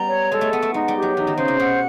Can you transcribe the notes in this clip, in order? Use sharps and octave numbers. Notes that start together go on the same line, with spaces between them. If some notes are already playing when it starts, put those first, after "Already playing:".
Already playing: G3 B3 A#5
C#5
G#3 A4
A3
B3 F#5
A3
G#3 D#4
G3
G4
F#3
E3 D#4
D#3
C#3 C5
C3
B2 F#5